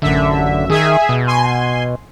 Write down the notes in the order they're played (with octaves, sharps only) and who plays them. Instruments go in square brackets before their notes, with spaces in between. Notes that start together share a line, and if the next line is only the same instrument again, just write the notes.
[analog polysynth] A1 F#2 E5 [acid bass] D3
[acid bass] D#3 [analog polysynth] G#4 E5 G#5
[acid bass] B2
[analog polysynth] G#5 C6